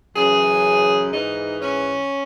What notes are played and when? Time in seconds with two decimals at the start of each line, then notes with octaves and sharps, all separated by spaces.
0.16 F#2 C#3 E3 G#4
1.11 G#2 E3 D#4
1.60 C#4